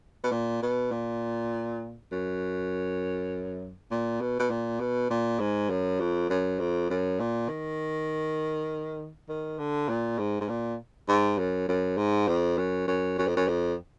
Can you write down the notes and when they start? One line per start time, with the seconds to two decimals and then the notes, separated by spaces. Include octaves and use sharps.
0.24 B2
0.32 A#2
0.62 B2
0.91 A#2
2.12 F#2
3.91 A#2
4.21 B2
4.40 B2
4.50 A#2
4.80 B2
5.10 A#2
5.40 G#2
5.70 F#2
6.00 F2
6.30 F#2
6.59 F2
6.90 F#2
7.20 A#2
7.49 D#3
9.29 D#3
9.59 D3
9.89 A#2
10.19 G#2
10.41 G#2
10.49 A#2
11.09 G#2
11.38 F#2
11.69 F#2
11.98 G#2
12.28 F2
12.58 F#2
12.87 F#2
13.18 F#2
13.27 F2
13.37 F#2
13.48 F2